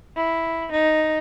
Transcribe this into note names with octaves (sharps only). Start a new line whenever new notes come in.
E4
D#4